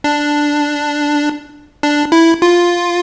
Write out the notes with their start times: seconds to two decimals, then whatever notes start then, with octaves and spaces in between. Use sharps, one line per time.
0.04 D4
1.83 D4
2.12 E4
2.42 F4